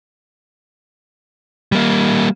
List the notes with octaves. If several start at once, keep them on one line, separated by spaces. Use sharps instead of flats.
G3 A#3